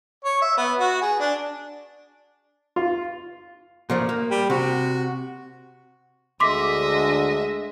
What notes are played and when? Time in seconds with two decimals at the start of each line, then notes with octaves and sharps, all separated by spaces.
0.24 C#5
0.41 E5
0.57 B3
0.79 F#4
1.01 G#4
1.19 D4
2.76 F4
3.90 A#2 F3 A3
4.09 A#3
4.31 G3
4.50 C3 F#4
6.40 D2 D3 G#3 D#5 E5 C6 D6 B6